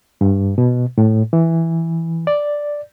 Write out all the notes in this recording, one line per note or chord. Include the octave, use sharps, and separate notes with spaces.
G2
B2
A2
E3
D5